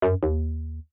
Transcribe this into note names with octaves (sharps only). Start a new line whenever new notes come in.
F#2
D#2